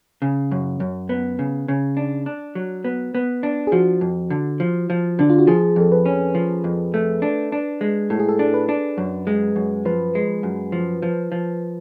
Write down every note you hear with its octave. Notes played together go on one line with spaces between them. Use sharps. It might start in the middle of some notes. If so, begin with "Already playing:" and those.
C#3
F#2
F#2
B3
C#3
C#3
D4
D4
F#3
B3
B3
D4
G#4
F3 F#4
F2
D3
F3
F3
D3 D4
F4
F#4
F3 G#4
F2 A4
B4
C#4
F3
F2
A3
D4
D4
G#3
A2 A4
G#4
A4
D4
B4
D4
F#2
G#3
F#2
F3 B4
G#3
F#2
F3
F3
F3